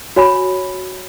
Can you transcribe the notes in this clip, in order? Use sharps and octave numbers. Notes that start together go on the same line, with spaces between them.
F#4 C#5 G#5 B5